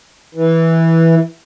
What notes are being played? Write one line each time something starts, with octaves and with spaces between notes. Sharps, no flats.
E3